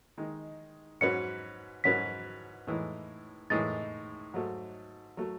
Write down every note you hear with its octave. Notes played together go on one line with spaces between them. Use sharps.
D#3 G#3 D#4
G#2 F#3 C#4 F#4 B4 C#7
G#2 F#3 C#4 F#4 B4 B6
A2 E3 G#3 D#4
A2 E3 G#3 D#4 A6
G#2 F#3 A3
F#3 A3